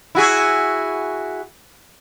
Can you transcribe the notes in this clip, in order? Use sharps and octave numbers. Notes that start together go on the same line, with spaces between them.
E4 F#4 G#4